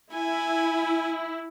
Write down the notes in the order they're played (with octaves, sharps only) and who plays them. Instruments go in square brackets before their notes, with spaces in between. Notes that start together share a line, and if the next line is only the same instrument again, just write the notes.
[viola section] E4 [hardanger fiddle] G#5